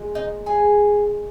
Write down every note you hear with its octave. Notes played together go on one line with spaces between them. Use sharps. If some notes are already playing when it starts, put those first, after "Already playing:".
Already playing: A#2 G#3
D#4 D#5
G#4 G#5